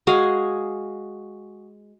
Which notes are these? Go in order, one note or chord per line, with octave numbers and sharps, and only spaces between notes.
G#3 F#4 G#4 F5